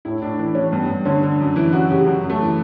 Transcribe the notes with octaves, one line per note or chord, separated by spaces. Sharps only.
A2 E4
A2 D4
E3 D4
E3 C#4
G2 B3
G2
D3 C#4
D3
F#2
E3 E4
F#2 F#4
C#3 G4
F#2 F#4
F#2
A3
E3